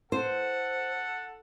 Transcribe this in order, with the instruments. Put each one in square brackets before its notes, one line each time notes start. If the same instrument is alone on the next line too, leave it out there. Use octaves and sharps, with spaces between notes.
[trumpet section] A4 F#5 [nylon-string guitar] C5